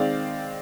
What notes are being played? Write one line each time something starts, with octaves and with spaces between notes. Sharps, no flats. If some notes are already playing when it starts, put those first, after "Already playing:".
Already playing: D#3 G#3 C4 D5 F5